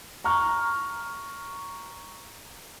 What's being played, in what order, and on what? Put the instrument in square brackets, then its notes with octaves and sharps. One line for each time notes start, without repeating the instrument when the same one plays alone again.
[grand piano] A#5 C#6 F6